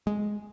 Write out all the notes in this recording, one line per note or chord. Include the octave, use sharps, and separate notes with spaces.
G#3